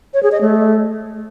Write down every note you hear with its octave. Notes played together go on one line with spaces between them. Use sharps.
C#5
G#4
D#5
A3